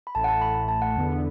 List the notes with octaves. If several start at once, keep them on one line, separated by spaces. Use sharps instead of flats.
B5
A1 A2 A3 A5
F#5
A5
B5
B5
A5
F#5
E2 D3 B3